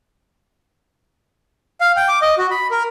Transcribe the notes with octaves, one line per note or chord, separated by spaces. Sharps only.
F5
G5
D6
D#5
F#4
B5
A#4